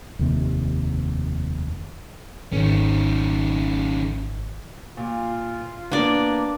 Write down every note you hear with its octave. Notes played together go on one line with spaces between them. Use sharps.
F1 D#2 C3
G#1 D#3 C#4
A#2 F4
A#3 B3 D4 D5